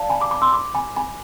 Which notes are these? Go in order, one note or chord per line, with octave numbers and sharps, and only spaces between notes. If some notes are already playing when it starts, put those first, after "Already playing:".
Already playing: D5 F5 A5
G#5 B5
B5 D6
B5 D6
C6 E6
B5 D6
G#5 B5
G#5 B5